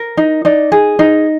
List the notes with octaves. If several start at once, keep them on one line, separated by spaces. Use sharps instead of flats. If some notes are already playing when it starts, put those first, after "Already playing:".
Already playing: A#4
D#4
D#4 D5
G#4
D#4